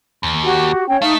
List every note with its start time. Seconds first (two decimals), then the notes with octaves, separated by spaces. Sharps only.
0.23 D#2
0.43 F#4 G4
0.88 C#4 C#5 G5
1.02 A3 D#4 F5